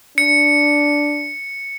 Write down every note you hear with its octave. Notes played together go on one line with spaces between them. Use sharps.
D4 C#7